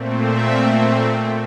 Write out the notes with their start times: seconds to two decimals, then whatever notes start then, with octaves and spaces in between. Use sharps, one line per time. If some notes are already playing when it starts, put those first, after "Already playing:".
Already playing: A#2 A3 C4
0.24 E5